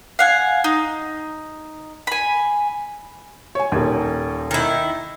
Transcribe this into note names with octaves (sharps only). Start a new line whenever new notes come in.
F5 F#5 G#5
D#4
G#5 B5
C#5 G#5
D#1 D#2
D#3 E4